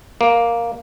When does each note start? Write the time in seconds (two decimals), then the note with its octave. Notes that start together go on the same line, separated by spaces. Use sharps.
0.21 A#3